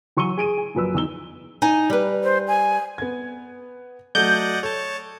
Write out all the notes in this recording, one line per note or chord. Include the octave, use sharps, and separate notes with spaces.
E3 F#3 C#6 E6 D#7 G7
G#4 D7 D#7
G#5
A#1 F#2 B4 E6
E2 D#4 E6 G7
D#4 G#5
G3 B4
C5
G#5
B3 G#6
F#3 A3 D5 D#5 F#5 G6
A4 C#5 A5